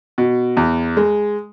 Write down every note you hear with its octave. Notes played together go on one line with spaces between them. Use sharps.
B2
E2
G#3